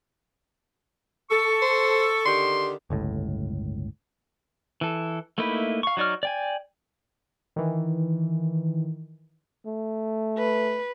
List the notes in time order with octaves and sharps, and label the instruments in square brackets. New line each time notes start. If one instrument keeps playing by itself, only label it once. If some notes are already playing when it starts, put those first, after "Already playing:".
[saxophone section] A4 [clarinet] C#6
[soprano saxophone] C5
[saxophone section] D3 D#3 G4 [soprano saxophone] C6
[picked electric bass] G1 C#2 A2
[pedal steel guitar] E3 A4
A3 A#3 D#4 E4 B4
F5 C#6
F#3 D#4 D5 C#6 F6
D5 G5 G#5
[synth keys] D#3 E3
[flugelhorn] A3
[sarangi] B4